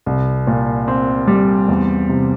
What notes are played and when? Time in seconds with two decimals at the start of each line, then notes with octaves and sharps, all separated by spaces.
0.06 C2
0.47 A#2
0.88 C4
1.28 G3
1.69 E2
2.09 C3